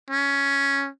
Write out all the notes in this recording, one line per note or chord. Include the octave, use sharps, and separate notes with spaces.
C#4